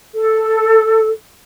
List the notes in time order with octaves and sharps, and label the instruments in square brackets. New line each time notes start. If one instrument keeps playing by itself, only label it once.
[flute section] A4